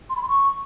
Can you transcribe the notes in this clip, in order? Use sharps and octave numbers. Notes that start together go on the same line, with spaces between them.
C6
B5
C6
C#6